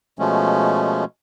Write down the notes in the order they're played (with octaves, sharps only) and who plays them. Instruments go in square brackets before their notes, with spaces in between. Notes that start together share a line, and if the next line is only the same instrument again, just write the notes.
[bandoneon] B2 F3 G#3 A3 C#4